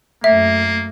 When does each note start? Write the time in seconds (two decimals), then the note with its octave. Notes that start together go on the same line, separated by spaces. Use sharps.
0.24 F#2 A3 A#3 E5